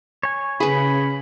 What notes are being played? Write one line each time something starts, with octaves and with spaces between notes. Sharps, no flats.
C#5 G#5
C#3 G#4 B4 B5